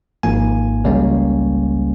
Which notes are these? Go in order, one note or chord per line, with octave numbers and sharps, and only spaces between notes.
G#1 G#2 F3 A#3 G#5
C#2 C#3 G3 A#3 C#4